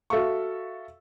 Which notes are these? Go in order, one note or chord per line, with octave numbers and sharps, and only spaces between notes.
F#4 A4 E5 F5 C#6